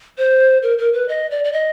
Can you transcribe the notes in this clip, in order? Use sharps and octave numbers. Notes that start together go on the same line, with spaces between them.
C5
A#4
A#4
B4
D#5
D5
D5
D#5